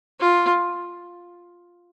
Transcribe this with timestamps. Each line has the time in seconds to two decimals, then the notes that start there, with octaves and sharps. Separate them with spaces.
0.20 F4